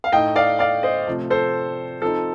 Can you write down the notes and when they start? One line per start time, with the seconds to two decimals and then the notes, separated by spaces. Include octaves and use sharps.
0.04 F5
0.12 A2 A3 D#4 D#5 G5
0.36 D5 F5
0.59 D5 F5
0.83 C5 D#5
1.07 C3 F3 A3
1.30 A4 C5
2.02 F3 C4 D#4 A4